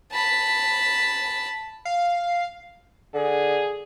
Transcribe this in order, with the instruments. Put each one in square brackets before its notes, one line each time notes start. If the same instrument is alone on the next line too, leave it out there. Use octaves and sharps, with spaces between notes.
[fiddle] A5 B5
[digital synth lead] F5
[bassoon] D3 [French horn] G#4